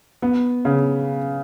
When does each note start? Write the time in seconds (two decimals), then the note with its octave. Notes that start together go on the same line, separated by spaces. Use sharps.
0.22 B3
0.65 C#3